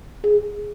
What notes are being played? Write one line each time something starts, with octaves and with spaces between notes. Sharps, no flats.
G#4